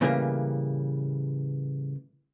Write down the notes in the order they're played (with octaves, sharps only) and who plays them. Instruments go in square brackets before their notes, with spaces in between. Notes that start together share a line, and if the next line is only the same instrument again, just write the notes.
[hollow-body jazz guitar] A2 C#3 E3 G3 A3 A#3